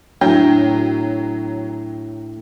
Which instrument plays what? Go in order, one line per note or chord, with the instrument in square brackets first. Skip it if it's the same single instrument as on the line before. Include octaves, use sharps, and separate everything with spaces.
[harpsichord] A2 [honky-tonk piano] F#3 [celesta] D4 [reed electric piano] G5